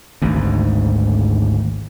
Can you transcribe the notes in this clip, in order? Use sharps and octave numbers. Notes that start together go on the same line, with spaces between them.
G#1 D2 G#2